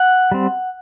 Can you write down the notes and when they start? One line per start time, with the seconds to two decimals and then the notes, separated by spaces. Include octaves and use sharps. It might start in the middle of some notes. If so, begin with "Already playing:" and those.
Already playing: F#5
0.32 G3 C4